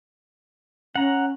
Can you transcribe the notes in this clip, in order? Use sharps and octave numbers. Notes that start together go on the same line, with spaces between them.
C#4 F#5 A#5